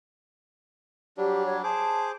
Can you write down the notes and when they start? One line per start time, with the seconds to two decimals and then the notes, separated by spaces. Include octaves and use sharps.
1.17 F#3 G3 D4 G4
1.46 C#5
1.63 G#4 C5 A5 D6